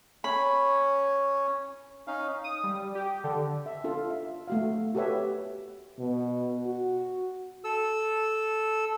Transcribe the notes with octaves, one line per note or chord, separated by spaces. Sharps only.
C#4 C#5 B5
C#4 D#4 F5
D#6
G3
G4
D3
E5
D4 F4 A4
E5
A3 F#4 F5
F#4 G4 A4 B4 C#5 E5
B2
F#4
A4 E6